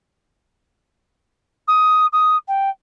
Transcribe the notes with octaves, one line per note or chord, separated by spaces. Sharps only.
D#6
D#6
G5